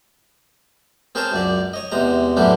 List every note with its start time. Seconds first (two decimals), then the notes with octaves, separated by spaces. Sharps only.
1.15 C4 G#4 A#4 C5 C#5 A5
1.32 C#2 F#2 D5
1.74 C#5 D#5
1.92 E2 C3 G#3 A#5
2.37 F#2 A2 E3 F#3 C#4 D4